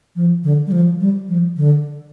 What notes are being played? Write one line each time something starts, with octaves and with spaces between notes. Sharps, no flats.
F3
D3
G3
F3
G3
F3
D3